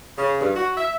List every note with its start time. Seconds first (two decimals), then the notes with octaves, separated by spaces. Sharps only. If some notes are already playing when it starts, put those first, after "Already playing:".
0.18 C#3
0.41 G2
0.56 F#4
0.77 E5